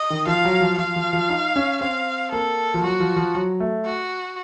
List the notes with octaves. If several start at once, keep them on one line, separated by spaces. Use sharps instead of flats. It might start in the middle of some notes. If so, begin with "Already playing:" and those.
Already playing: D#5
D#3
F3 F5
F#3
F3
F3 F5
F3
F3
D#4
C#4
C4 F5
A#3 A4
F3
F#3 F#4
F3
F3
F#3
A3
F#4